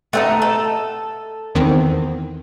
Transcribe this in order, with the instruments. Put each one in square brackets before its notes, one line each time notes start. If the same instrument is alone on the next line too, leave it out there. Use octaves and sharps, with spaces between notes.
[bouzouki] A3 C4 D#4 [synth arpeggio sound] F#5
[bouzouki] A4
[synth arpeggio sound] E2 D#3 C4